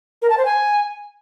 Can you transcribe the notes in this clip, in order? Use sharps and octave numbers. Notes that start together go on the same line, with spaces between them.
A#4
A5
C5
G#5